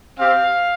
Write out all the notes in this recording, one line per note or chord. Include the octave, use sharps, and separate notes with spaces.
C4 G4 F5